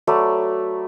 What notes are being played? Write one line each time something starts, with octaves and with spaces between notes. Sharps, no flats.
F#3 A3 B4 D5